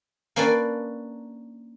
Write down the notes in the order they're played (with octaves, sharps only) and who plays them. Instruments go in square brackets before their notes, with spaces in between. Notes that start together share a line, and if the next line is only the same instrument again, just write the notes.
[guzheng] A#3 C#4 D4 B4 D5